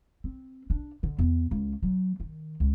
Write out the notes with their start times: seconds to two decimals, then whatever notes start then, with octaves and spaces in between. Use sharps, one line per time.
0.24 C4
0.70 D4
1.03 D3
1.19 E2
1.51 C#2
1.83 F#3
2.20 D#3
2.60 C#2